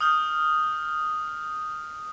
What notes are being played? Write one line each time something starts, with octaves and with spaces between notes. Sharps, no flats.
D#6 F6 G6